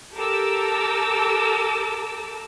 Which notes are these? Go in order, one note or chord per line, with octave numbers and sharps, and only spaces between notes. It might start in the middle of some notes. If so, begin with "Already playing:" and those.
G4 A4 A#4 A5 D6 E6